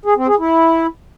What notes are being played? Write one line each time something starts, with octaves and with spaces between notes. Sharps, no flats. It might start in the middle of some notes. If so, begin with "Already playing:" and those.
G#4
C4
G#4
E4